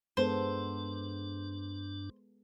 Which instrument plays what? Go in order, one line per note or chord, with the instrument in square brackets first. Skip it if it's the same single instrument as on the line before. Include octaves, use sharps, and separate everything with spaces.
[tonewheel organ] G2 D4 [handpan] G#3 B3 A4 [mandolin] C5